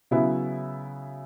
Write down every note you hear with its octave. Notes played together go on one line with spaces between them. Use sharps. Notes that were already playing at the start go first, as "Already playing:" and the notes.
C#3 F#3 B3 E4 B4